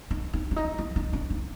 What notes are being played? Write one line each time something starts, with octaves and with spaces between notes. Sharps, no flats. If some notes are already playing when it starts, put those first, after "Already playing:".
D#4
D#4
D4
D#4
E4
D#4
D4
D#4